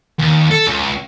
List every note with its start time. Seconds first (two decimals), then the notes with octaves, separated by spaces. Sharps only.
0.19 D#2
0.51 A4
0.67 C#2